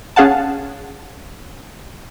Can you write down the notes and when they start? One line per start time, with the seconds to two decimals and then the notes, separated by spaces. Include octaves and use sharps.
0.16 C#4 G#4 F5 F#5 A5